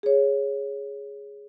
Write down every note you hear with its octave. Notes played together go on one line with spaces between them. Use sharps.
G#4 C#5